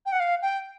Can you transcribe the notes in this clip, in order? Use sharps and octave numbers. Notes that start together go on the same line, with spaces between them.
G5
F#5
F5
G5